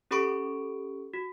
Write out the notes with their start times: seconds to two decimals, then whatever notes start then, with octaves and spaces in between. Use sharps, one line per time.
0.11 C#4 G4 A4 B5 C#6 D7
1.14 F#4